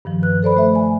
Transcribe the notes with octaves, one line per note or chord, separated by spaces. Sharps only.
G2 D#3 F3
B4 F#6
A4 C5 D5 B5
A3 E5
G#5